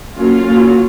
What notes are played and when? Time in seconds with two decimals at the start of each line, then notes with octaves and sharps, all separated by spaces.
0.15 F#3 A#3 C#4 F4
0.43 F#3 A#3 C#4